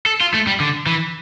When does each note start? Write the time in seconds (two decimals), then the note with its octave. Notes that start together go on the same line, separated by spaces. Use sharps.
0.06 A4
0.21 F4
0.34 A3
0.47 G3
0.60 D3
0.86 E3